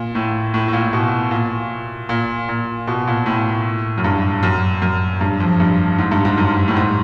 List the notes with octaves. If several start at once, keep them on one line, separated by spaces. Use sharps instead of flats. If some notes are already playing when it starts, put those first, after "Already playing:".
Already playing: A#2
A2
A2
A2
A#2
B2
A#2
A#2
A#2
B2
A#2
A2
F#2
G2
F#2
F#2
G2
F2
G2
G#2
G2
G#2
F#2
A2
G#2